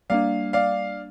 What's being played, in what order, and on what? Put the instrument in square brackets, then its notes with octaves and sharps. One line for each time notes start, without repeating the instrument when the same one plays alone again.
[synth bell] G3 A#3 D4 [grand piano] D5 F5
[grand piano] D5 F5